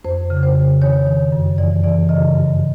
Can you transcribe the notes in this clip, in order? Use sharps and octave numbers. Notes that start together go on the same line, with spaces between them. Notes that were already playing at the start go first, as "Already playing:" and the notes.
F2 C5
C#3
C5
C#3
D#3 C#5
D#3
F#2
E3 D5
E3 D5
C#3 D#5
G2